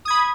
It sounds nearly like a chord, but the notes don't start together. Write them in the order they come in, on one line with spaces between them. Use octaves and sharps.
D#6 G#6 B5